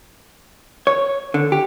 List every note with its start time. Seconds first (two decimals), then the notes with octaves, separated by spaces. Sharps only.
0.87 C#5
1.34 D3
1.52 G4